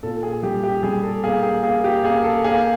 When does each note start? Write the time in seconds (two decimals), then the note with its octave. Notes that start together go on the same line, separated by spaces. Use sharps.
0.03 A#2 A4
0.23 G#4
0.43 G3 G4
0.63 G4
0.83 G3 G#4
1.03 A4
1.23 A#3 G#4
1.43 G#4
1.63 A#3 G#4
1.84 G4
2.04 A#3 G#4
2.24 A4
2.44 A#3 G#4